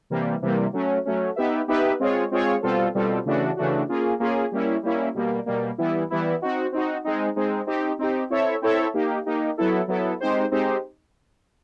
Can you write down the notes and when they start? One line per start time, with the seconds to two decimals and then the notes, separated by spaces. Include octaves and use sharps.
0.10 C3 E3 G3 A#3
0.42 C3 E3 G3 A#3
0.73 F#3 A3 C#4
1.05 F#3 A3 C#4
1.36 B3 D#4 G4 B4 E5
1.68 B3 D#4 G4 B4 E5
2.00 G#3 C4 F4 G#4 C#5
2.31 G#3 C4 F4 G#4 C#5
2.62 B2 G3 C4 F4 A4
2.95 B2 G3 C4 F4 A4
3.25 C#3 E3 A3 D4 F#4
3.57 C#3 E3 A3 D4 F#4
3.89 A#3 C#4 F4 G#4
4.20 A#3 C#4 F4 G#4
4.52 G3 A#3 C#4 E4
4.83 G3 A#3 C#4 E4
5.14 B2 G3 A#3
5.46 B2 G3 A#3
5.78 E3 G3 B3 E4
6.10 E3 G3 B3 E4
6.42 C4 D#4 F#4
6.72 C4 D#4 F#4
7.05 G#3 C4 D#4
7.36 G#3 C4 D#4
7.67 C4 D#4 G4
7.99 C4 D#4 G4
8.30 C4 E4 A4 C#5 E5
8.62 C4 E4 A4 C#5 E5
8.94 A#3 D#4 G4
9.26 A#3 D#4 G4
9.57 F#3 B3 E4 A4
9.88 F#3 B3 E4 A4
10.20 G#3 C4 D#4 G4 C5
10.51 G#3 C4 D#4 G4 C5